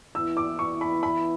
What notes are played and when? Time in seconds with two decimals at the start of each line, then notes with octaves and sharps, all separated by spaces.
0.15 E3 B3 E4 E6
0.37 D6
0.59 C#6
0.81 B5
1.03 B5